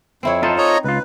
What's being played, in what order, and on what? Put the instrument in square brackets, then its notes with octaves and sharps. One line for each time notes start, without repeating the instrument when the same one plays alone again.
[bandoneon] F2 [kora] C4 E4 C#5
[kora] D#4 [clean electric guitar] F4 A4 C5
[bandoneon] C#5 D#5 A#5
[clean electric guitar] C#2 F4 [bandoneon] B4